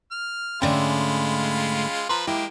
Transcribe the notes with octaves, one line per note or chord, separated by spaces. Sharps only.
F6
G#2 D3 G#3 A3 C#4 F4 G5 B5
F3 B4 A#5 C6
G#3 A#3 E4 G4